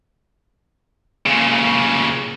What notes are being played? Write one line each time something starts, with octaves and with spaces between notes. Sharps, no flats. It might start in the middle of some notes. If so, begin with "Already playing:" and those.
A#2 C#3